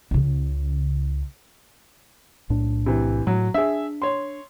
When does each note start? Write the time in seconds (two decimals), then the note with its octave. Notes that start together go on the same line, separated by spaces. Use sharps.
0.11 C#2 C#3
2.49 B1 A2 D4
2.86 C3 E3
3.27 A2 F#3
3.54 D4 G#4 E5
4.02 C#5 C6